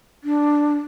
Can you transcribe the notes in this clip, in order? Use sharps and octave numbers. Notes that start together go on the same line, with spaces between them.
D4